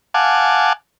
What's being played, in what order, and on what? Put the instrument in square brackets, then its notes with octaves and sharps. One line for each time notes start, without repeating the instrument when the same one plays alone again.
[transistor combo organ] F5 F#5 G#5 A5 D6